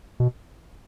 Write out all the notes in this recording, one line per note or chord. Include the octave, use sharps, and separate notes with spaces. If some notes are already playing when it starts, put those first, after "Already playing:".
B2